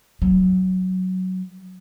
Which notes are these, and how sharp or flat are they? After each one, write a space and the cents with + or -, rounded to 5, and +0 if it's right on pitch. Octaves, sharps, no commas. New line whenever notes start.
F#3 +5